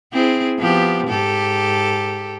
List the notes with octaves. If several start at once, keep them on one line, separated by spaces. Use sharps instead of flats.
C4 E4 G#4
F3 B3 G4
G#2 G4 A4